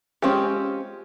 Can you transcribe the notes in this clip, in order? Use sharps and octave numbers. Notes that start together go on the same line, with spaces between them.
G#3 C4 C#4 F4 G4